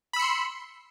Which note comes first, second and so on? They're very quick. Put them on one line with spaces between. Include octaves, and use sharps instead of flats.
B5 E6 C#7 C6